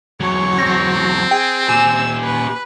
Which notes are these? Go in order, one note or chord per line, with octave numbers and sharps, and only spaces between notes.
E2 F#3 C#5
C4 A#6
G#4 G5
A#2 G4 G#5 E6
B4